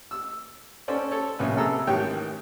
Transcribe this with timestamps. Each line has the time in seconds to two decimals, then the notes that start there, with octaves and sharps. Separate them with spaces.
0.11 E6
0.88 C#4 A4 C5 D5
1.11 A4 C#5
1.39 A#1 C3 C#4 B4
1.57 C3 G#4 A4 A#5 E6
1.87 A1 G#2 D#3 G4 C#5 G5